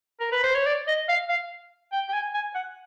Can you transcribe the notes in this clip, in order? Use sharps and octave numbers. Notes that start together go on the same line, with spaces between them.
A#4
B4
C5
C#5
D5
D#5
F5
F5
G5
G5
G#5
G#5
F#5